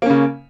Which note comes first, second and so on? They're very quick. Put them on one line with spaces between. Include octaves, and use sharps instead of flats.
A#3 C#4 C#3